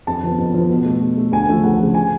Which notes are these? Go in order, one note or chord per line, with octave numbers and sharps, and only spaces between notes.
F2 A5
F3 B3
F2
F3 B3
B2
A3
B2
A3
D2 G#5
C#3 F3 A3
D2 F#5
C#3 F3 A3
G#5